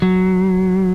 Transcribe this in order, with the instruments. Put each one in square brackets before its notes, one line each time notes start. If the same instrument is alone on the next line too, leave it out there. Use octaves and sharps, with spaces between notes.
[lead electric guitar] F#3